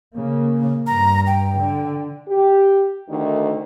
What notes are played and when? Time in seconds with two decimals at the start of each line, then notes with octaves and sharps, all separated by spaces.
0.15 C#3 A#3
0.87 G2 A#5
1.27 G5
1.56 D3
2.28 G4
3.08 D2 D#3